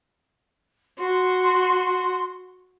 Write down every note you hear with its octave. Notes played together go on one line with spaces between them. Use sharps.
F#4 C6